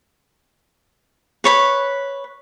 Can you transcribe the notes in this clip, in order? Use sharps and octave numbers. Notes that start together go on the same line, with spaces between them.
B4 C#5 B5